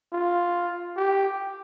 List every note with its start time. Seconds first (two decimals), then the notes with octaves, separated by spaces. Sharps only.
0.13 F4
0.97 G4